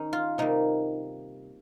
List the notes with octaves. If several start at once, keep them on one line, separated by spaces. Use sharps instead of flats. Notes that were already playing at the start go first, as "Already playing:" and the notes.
Already playing: D#3 C#4 D#4
F4
C3 G3 A#3 D#4